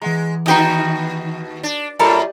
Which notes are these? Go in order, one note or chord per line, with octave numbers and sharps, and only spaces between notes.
E3 G#3 F#5 A#5
D#2 D#4 F#4 B4 G5 D#6
D4
F#2 A2 G4 A4 A#4 D5 D#5 B5